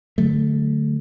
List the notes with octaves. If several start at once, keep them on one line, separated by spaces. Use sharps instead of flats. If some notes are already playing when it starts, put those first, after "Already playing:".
D3 F#3 A3